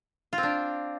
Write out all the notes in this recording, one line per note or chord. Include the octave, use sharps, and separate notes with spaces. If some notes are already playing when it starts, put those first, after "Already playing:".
F4
C4
D4